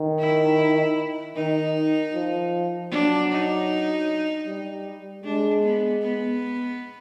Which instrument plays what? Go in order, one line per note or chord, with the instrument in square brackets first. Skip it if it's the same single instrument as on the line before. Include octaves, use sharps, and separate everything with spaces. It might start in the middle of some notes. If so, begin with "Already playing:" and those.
Already playing: [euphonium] D#3
[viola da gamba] E4
[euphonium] D#3 [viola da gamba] D#4
[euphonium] F3
[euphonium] F#3 [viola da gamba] D4
[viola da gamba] D#4
[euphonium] G3
[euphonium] G#3 [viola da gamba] D4
[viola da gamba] B3
B3